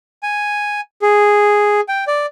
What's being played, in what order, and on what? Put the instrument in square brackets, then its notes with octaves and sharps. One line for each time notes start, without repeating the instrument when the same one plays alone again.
[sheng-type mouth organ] G#5
G#4
G5
D5